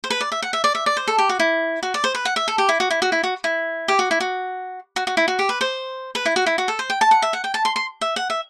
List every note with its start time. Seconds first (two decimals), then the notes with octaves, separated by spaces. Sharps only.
0.04 C5
0.10 B4
0.21 D5
0.32 E5
0.42 F#5
0.53 E5
0.64 D5
0.75 E5
0.86 D5
0.97 C5
1.08 A4
1.18 G4
1.29 F#4
1.39 E4
1.83 F#4
1.94 D5
2.04 C5
2.15 B4
2.25 F#5
2.36 E5
2.48 A4
2.58 G4
2.69 E4
2.80 F#4
2.90 E4
3.02 F#4
3.12 E4
3.24 F#4
3.44 E4
3.88 G4
3.99 F#4
4.11 E4
4.20 F#4
4.96 F#4
5.07 F#4
5.17 E4
5.28 F#4
5.39 G4
5.49 B4
5.61 C5
6.15 B4
6.26 E4
6.36 F#4
6.46 E4
6.58 F#4
6.68 A4
6.79 C5
6.90 G5
7.01 A5
7.11 F#5
7.22 E5
7.33 F#5
7.44 G5
7.54 A5
7.65 C6
7.76 C6
8.01 E5
8.16 F#5
8.30 E5